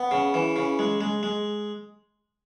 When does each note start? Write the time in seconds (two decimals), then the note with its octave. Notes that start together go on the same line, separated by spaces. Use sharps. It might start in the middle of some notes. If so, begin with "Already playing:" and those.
Already playing: B3
0.11 C#3
0.34 E3
0.56 C#3
0.79 G#3
1.01 G#3
1.23 G#3